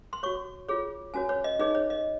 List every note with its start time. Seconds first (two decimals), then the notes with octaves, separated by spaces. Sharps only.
0.13 C6
0.23 F#4 C#5 C#6
0.68 F4 G#4 C#5
1.14 C#4 F#4 C#5 G#5
1.29 C#5
1.44 D#5
1.59 D#4 G#4 C#5 D#5
1.75 C#5
1.90 D#5